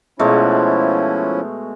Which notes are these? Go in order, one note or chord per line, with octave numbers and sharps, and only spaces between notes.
B2 F3 G#3 A3 C#4 E4